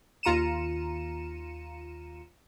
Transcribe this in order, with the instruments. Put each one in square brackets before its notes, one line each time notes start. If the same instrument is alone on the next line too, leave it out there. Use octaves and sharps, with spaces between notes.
[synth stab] D#2 F4 A#5 C#7 D#7 E7